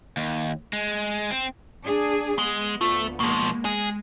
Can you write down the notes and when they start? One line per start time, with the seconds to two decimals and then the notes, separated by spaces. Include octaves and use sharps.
0.17 D#2
0.73 G#3
1.31 C4
1.83 D4 G#4
2.38 G#3 B3
2.81 D2 A3 F4
3.20 B2 F3 G#3 A#3
3.65 G#3 G#4